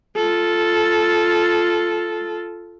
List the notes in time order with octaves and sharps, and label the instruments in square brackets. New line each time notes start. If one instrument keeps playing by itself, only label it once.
[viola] F4 A4